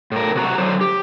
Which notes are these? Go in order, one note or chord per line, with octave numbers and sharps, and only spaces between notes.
A2 A#4
C3 F#4 A#5
D3 F#3 C5
G4